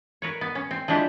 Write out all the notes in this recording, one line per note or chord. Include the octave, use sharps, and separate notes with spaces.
A#4 B4 C#5
B3
C#4
C4
F3 G#3 D4 E4 G4